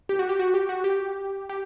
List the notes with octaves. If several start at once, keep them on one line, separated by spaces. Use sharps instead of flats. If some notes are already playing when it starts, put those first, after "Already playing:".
G4
F#4
G4
F#4
G4
F#4
G4
G4